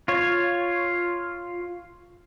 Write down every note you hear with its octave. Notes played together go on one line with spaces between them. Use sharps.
F4 C#5